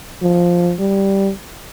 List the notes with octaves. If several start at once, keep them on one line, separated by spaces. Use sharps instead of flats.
F3
G3